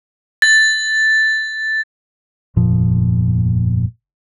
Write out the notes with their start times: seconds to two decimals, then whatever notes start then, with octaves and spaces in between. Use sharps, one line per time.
0.42 A6
2.56 G1 F2 A#2 F3